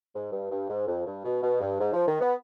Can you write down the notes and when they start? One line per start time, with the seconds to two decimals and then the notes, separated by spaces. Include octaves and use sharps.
0.14 G#2
0.32 G2
0.51 G2
0.69 G#2
0.87 F2
1.06 G2
1.24 B2
1.42 B2
1.61 G2
1.79 G#2
1.93 F3
2.07 D#3
2.20 B3